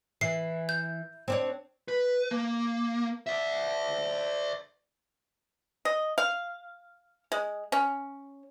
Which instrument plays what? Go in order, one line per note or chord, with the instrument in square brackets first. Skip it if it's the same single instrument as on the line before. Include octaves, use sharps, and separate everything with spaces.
[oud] E3 [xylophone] C7
[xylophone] G6
[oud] C4 D4 C#5
[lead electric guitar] B4
A#3
D5 E5
[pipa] D#5
F5
G#3
C#4